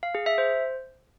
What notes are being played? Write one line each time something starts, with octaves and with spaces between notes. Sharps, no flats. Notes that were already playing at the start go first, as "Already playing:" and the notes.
F5
G#4
E5
C5